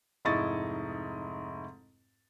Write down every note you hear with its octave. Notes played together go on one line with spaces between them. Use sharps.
F1 G#2 E4 D#5 C#6 A6